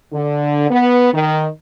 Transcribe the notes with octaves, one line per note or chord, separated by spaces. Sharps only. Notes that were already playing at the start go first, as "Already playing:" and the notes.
D3
B3
D#3